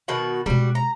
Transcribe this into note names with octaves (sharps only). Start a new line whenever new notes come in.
B2 D#3 F#4
B2 G3 G#3 F#4
A#5